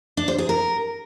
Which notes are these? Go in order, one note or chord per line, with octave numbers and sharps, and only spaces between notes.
D4
C5
G#4
A#4